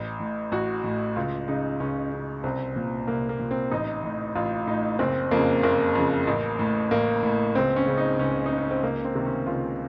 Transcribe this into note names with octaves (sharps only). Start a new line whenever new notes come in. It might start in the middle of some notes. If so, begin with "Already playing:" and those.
Already playing: A1
A2
A1 F#4
A2
C#2 F4
C#3 D#4
C#2 C#4
C#3
C2 C4
A#2
C2 A#3
A#3
A#2
C4
A1 D#4
A2
A1 F4
A2 D#4
F#1 C4
F2 C#3 A#3
F#1 A#3
F2 C#3
A1
A2
A1 A#3
A2
C#2 C4
C#4
C#3
D#4
C#2 C#4
D#4
C#3
C#4
C4
C#2 A#3
C4
C3 D#3
C#4
C#2 F4